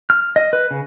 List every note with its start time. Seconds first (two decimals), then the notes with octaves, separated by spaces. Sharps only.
0.10 F6
0.36 D#5
0.53 B4
0.71 C#3